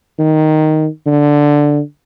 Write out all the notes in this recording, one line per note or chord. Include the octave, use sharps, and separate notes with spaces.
D#3
D3